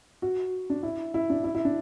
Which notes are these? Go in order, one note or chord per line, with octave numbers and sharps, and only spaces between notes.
F#4
D4
E4
E4
D4
E4
E4
D4